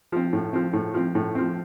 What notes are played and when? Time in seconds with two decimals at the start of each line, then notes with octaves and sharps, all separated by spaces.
0.12 F3 C4
0.33 A2
0.53 F3 C4
0.73 A2
0.94 F3 C4
1.15 A2
1.35 F3 C4